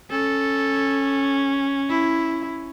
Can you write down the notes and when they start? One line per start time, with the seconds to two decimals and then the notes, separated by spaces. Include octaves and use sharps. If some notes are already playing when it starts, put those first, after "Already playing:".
0.10 C#4 A4
1.89 E4